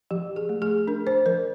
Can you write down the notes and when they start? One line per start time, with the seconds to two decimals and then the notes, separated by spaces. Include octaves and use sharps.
0.11 F3 G4
0.36 G#4
0.49 A3
0.62 G#4
0.87 D4 A#4
1.07 C5
1.26 F3 A#4